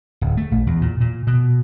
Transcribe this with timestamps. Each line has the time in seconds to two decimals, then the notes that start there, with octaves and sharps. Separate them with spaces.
0.21 D1
0.37 A3
0.51 A#1
0.67 E2
0.81 A#2
1.01 A#2
1.27 B2